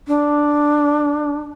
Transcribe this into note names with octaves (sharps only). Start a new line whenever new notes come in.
D4